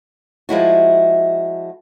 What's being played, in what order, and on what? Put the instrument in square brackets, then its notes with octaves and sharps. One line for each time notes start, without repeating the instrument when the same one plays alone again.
[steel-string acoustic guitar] F3 G#3 E4 F#4